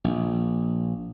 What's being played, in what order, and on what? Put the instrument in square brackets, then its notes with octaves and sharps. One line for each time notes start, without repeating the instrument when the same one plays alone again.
[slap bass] A#1